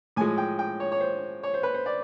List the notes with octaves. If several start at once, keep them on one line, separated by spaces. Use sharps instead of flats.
A2 F3 G#3 G#5
G5
G5
C#5
C#5
C5
C#5
C5
B4
C5
D5